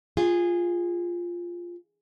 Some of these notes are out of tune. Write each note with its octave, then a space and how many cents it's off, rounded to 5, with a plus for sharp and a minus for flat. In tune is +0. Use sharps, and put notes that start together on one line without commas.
F4 +0 G#4 -20